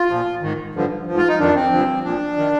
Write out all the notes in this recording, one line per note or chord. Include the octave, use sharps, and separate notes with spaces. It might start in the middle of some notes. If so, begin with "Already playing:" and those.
Already playing: F4
A#2 F3
G#2 D#3
G2 D3 F3
G#2 F3
F4
D#4
F2 D#3 D4
C4
G2 D3 F3
A#2 F3 D4
D#3